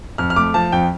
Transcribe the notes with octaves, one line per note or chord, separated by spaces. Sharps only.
F2 F6
F6
A3 D6
F3 A5
F2 G5